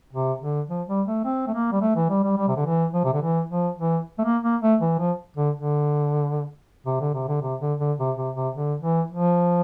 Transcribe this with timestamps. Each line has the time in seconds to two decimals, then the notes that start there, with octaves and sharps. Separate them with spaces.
0.13 C3
0.41 D3
0.69 F3
0.88 G3
1.07 A3
1.25 C4
1.47 A3
1.54 A#3
1.72 G3
1.81 A3
1.96 E3
2.09 G3
2.23 G3
2.37 G3
2.48 C3
2.56 D3
2.66 E3
2.94 F3
3.04 C3
3.13 D3
3.21 E3
3.49 F3
3.78 E3
4.18 A3
4.24 A#3
4.43 A#3
4.62 A3
4.80 E3
4.99 F3
5.37 D3
5.55 D3
6.86 C3
7.01 D3
7.14 C3
7.28 D3
7.42 C3
7.60 D3
7.79 D3
7.99 C3
8.17 C3
8.36 C3
8.54 D3
8.82 E3
9.11 F3